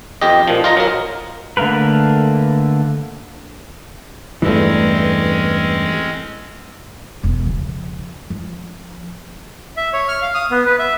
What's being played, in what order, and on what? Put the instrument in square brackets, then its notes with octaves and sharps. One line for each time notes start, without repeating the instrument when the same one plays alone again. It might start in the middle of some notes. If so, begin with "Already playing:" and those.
[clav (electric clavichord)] F2 G4 D#5
A#2 F3
F4 D#5 A#5
F#3 A#4
[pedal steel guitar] D3 A3 A#3 A#4 B4
[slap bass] E2 G2 [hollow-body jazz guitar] E3 A3 [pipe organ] G#3 C4 C#4
[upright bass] E1 C#4
C#3 F3
F3
[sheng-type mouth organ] E5
C#5
F6
F5
D#6
B3
B4
E5